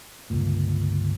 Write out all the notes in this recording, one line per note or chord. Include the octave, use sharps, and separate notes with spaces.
G1 C#2 A#2